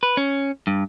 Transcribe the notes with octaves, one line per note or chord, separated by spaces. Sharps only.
B4
C#4
G2